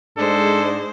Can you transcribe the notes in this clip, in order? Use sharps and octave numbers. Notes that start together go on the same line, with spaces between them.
G#2 G#3 D4 A4 C5